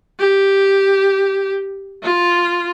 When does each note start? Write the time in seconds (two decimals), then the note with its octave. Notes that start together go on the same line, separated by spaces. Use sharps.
0.20 G4
2.04 F4